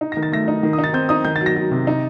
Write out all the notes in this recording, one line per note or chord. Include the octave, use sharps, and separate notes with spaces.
D#4
D#3 A#6
A6
A3 A#6
D#4
D#3
D#6
D#4
A6
C4 G6
D#4 D#6
D#3 G6
A6
F#3
A#6
F#3
C3
D#4